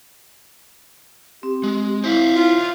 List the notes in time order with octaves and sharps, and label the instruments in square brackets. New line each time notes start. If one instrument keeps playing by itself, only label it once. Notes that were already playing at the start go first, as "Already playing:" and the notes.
[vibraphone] C4 [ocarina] G4
[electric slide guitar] G#3
[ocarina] E4 [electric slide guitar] C5 E5 F5
[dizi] F4